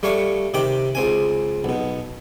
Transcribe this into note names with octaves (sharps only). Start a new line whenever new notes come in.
G3 A3 C#5 F5 C#6
C3 D#3 G5 B5 D6
C#2 C4 G#5
B1 B2